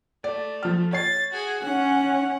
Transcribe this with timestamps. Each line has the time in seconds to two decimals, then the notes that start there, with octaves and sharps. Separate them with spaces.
0.24 A3 D5
0.63 F3 F6
0.93 C#5 A6 C7
1.32 F#4 G#4
1.64 C#4 F#5